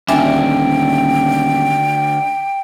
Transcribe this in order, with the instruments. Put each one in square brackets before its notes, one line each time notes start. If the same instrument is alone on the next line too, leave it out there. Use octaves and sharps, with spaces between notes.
[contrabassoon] D#1 [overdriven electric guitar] D2 [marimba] D4 E5 G#5 [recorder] G5